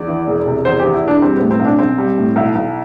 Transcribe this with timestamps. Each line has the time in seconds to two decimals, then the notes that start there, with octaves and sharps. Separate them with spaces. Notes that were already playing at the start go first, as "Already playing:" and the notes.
Already playing: E2 D5
0.08 E3
0.27 E1
0.46 C3
0.65 E2 C5
0.80 E3 G4
0.93 E4
1.03 E1 D4
1.22 G3 C4
1.37 A2 B3
1.51 C4
1.60 B1
1.65 D4
1.79 B1 C4
1.98 G3
2.18 A2
2.36 B1 E4
2.55 B1